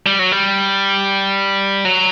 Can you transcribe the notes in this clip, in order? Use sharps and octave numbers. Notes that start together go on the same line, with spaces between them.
G3
F#3
G3
F#3